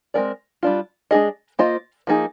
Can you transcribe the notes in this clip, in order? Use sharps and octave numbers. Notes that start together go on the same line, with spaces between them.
G#3 C4 D#4 A#4 D5
G3 D4 F4
G#3 D4 G#4 D#5
A#3 F4 C5 D#5
F3 A#3 D#4 G#4